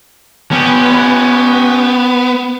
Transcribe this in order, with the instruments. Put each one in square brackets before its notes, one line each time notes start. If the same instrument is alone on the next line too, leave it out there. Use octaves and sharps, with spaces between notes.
[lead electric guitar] B3 [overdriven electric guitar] C#4 G4